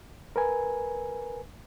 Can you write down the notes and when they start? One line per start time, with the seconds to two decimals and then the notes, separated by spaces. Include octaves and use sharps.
0.36 A#4 B4 G#5